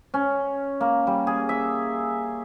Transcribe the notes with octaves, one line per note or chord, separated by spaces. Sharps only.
C#4
A#3
G3
G#4
E5